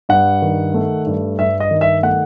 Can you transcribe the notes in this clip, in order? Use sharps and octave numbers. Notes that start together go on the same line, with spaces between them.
G2 F#5
D#3
A3
G2
G2 E5
D#5
D#3
E5
A3 F#5